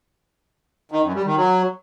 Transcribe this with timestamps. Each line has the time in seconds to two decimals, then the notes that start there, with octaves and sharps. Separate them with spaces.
0.92 D#3
1.03 F#2
1.14 G3
1.26 D#3
1.37 F#3